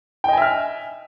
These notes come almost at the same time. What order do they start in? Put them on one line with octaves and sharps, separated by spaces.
G5 D#5 G#5 E5 F6